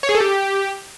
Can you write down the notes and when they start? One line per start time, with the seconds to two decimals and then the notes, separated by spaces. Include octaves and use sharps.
0.03 C#5
0.09 G#4
0.15 A4
0.20 G4